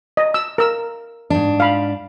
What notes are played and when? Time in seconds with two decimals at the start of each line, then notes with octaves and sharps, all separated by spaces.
0.17 D#5
0.34 E6
0.58 A#4 E6
1.30 G#2 D4
1.60 F5 B5